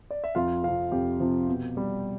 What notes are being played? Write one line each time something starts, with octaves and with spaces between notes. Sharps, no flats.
D5
E5
F2 F4 F5
C3 F3 F4 F5
F2 G4
C3 F3
B2
G3